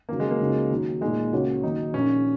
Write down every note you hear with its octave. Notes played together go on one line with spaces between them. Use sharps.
D#2 C#3 F#3 A#3
G#3
A#3
C#2 C#3 F#3 D#4
D#2 D#3 F#3 D#4
A#2 G#3 A#3 D#4 G#4
C#2 C#3 A#3 F#4 C#5
D#2 D#3 F#3 D#4
A#1 A#2 A#3 C#4 D#4